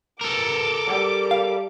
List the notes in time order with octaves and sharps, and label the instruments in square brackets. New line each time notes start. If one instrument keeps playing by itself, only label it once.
[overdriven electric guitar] A4 A#4 [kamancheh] D6
[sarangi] G3
[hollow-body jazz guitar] F5